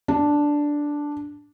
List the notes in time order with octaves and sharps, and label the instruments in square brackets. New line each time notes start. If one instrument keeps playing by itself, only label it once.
[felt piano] D4